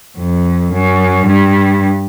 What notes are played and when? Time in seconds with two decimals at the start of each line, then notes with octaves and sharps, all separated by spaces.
0.18 F2
0.73 F#2
1.26 G2